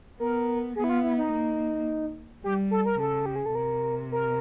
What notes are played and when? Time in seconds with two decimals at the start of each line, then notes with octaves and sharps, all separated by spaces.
0.20 B3 A#4
0.76 B3 G#4
0.84 E4
0.89 F4
1.03 E4
1.18 D#4
1.32 A#3
2.44 G3 G4
2.71 A4
2.85 A#4
2.99 C#3 A4
3.26 G4
3.36 G#4
3.46 A4
3.55 C3 A#4
4.12 A#4